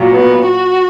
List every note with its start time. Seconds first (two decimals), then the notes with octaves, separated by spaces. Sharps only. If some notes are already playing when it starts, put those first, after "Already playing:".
Already playing: A#2 F#3
0.11 B3
0.46 F#4